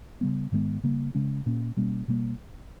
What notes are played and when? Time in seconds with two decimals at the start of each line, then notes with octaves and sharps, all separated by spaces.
0.21 C#3 G3 B3
0.52 G#2 D#3 G#3 B3
0.84 C#3 G3 A#3
1.15 C#3 G#3 C#4
1.46 A#2 A#3 C#4
1.77 B2 G3 A#3 C#4
2.08 B2 G3 A#3